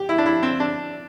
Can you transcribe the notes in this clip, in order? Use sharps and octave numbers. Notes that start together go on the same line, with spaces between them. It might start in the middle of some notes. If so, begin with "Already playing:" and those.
Already playing: G4
E4
D4
E4
C4
D4